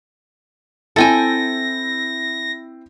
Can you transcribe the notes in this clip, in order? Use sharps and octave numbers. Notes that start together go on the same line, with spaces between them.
C4 E4 A4 G5 G#5 A#6